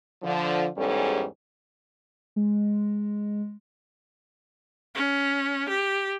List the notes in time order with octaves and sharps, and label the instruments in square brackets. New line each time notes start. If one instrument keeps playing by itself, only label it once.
[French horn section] D3 F3
E2 G#2 G3 C#4 A4
[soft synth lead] G#3
[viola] C#4
G4